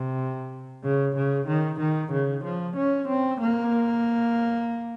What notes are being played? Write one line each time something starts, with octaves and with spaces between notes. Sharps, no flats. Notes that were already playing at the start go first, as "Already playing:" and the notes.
Already playing: C3
C#3
C#3
D#3
D#3
C#3
F3
C#4
C4
A#3